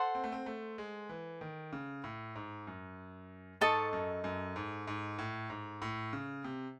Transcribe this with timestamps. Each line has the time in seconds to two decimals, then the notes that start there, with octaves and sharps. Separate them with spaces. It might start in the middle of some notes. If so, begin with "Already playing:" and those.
Already playing: A4 C5 F#5 C6
0.15 C4
0.24 A3
0.32 C4
0.46 A3
0.78 G#3
1.09 E3
1.41 D#3
1.73 C#3
2.04 A2
2.35 G#2
2.67 F#2
3.61 G#2 A4 D#5 A5 C#6
3.93 F#2
4.24 F#2
4.56 G#2
4.87 G#2
5.19 A2
5.50 G#2
5.82 A2
6.13 C#3
6.44 C3